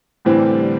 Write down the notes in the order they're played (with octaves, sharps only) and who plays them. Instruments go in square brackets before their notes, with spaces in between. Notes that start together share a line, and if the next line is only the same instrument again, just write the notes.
[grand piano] A2 E3 C4 [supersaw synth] D3 G3